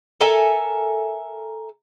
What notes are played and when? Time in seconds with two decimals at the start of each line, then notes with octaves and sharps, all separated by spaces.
0.21 A4 A#4 E5 G#5